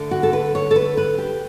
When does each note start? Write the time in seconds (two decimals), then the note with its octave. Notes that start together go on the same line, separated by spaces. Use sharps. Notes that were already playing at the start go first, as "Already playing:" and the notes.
Already playing: D3 A3
0.11 F#4
0.23 A4
0.33 B4
0.55 C#5
0.71 A4
0.76 B4
0.97 B4
1.18 G4